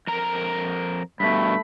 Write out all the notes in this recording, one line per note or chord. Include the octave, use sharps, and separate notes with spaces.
F2 A#4 A#5
G2 B2 A3 B5